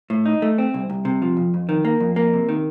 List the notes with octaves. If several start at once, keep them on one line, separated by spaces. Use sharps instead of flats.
A2
D#4
A3
C4
C2
C2
C3
F3
F2
F2
D#3
A#3
F2
A#3
C3
D#3